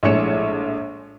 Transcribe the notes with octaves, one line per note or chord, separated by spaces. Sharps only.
A#1 A2 G#3 C#5 C#7 E7